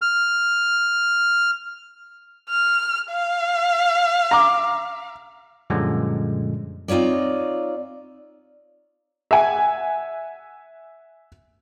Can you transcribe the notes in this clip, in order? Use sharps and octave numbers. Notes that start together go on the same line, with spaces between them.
F6
F6
F5
A#5 D6
F#2 A#2 D3 F3 G3 G#3
C4 D#4 F4 C#5 D5
E5 F#5 G#5